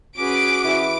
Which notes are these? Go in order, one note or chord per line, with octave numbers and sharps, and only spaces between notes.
C#4 F#4 G#4 B4 D6 D7
E3 E5